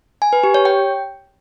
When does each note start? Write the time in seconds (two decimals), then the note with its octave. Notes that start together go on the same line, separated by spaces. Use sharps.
0.22 G#5
0.33 B4
0.44 G4
0.54 C#5
0.65 G5